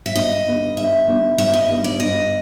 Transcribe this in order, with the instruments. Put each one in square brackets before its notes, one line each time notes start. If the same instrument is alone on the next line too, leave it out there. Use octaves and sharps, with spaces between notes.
[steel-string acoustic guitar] E5
[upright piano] G2 [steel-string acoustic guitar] D#5
[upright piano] D3 G3 B3 D#4
[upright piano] G2 [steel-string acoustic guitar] E5
[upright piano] D3 G3 B3 D#4
[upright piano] G2 [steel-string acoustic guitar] E5
[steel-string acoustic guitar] D#5
[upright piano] D3 G3 B3 D#4
[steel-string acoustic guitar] D5
[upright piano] G2 [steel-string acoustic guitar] D#5